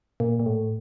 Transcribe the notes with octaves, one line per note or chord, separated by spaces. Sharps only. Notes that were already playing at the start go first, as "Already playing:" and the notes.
A#2
A#2
A2